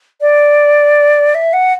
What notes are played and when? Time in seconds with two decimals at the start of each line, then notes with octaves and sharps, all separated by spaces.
0.21 D5
1.35 E5
1.53 F#5